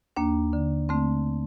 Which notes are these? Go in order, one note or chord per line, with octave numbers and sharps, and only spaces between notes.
D#2 A#3 D4
D3
D3 A3 C4